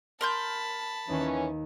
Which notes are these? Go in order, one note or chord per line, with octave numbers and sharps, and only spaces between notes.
A#4 A5 B5 C6 G6
D#2 E3 C#4 B4